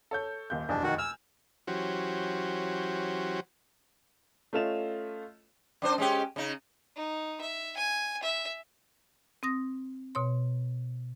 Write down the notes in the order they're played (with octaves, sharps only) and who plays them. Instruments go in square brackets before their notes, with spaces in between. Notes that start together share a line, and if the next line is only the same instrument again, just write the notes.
[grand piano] A4 C#5 G6
D#1 D#2 G6
[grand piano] F1 B1 E2 [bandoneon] D4
[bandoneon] D#3 F#4
[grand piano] G#5 F6 [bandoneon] E6
[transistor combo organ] E3 F#3 C#4 F#4 G4 C5
[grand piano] A3 C#4 F4 D#5 E7 F7
[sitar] F#2 D4 C5
G#3 C#4 G4
C#3 D#4
[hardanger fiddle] D#4
E5
G#5
E5
[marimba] C4 D#6 A#6
B2 C#5 C6